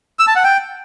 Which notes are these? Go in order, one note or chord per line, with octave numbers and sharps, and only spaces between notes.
E6
A5
F#5
G5